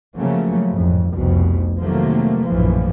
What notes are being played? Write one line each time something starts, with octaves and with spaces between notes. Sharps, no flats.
C#3 F3 F#3 A3 A#3 C#4
A1 F2 G#2
F1 C2 F2 B2
C3 D#3 F3 F#3 A3 A#3
A#1 F#2 A2 E3 F3